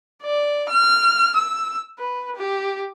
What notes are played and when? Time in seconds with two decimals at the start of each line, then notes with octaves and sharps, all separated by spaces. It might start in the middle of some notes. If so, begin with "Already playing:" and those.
0.23 D5
0.69 F6
1.36 E6
1.99 B4
2.36 G4